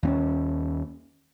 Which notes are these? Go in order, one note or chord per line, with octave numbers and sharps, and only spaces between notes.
D#2 C4 C#4